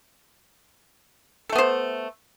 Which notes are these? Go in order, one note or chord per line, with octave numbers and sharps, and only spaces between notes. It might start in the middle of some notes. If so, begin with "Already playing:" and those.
A3 B3 A4 C5